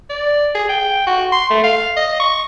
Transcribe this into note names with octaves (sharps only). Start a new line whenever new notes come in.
D5
G#4
G5
F#4
C6
A3
F5
D#5
C#6